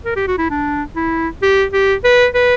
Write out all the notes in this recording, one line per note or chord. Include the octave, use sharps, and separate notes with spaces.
A#4
G4
F#4
E4
D4
E4
G4
G4
B4
B4